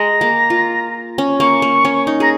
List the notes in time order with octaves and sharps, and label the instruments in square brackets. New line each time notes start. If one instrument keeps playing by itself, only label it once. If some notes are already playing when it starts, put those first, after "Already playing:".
Already playing: [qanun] G#3 [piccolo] A#5
[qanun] A#3
F4
C#4
[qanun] A#3 [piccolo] C#6
[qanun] A#3
C#4
D#4
[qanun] G#4 [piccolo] A#5